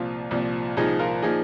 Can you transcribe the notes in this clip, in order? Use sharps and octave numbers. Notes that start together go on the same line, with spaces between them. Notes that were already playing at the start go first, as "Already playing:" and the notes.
Already playing: C2 A#2 F3 F4
C2 A#2 F3
C2 A#2 F3 D#4 G#4
F4 A#4
A#2 F3 D#4 G#4